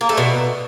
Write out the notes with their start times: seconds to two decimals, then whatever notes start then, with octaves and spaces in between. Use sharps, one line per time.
0.01 A#3
0.09 A3
0.18 B2